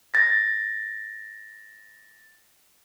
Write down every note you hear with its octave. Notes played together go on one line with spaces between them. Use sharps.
A6 A#6